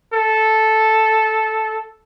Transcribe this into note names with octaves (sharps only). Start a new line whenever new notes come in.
A4